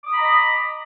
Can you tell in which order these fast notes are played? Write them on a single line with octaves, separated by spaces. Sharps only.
D6 D#6 B5 A#5 D#5